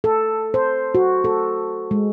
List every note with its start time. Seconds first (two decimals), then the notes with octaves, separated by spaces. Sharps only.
0.04 A4
0.54 C5
0.95 F#4
1.24 A4
1.91 G#3